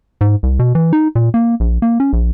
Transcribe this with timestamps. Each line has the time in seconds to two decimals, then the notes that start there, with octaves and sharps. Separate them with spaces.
0.21 G#2
0.43 C2
0.59 B2
0.75 E3
0.93 D#4
1.15 A#2
1.34 A#3
1.60 A#1
1.82 A#3
2.00 C#4
2.13 A#1